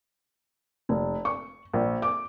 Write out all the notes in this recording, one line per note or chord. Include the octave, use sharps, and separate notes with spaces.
F1
C#6
A#1
D6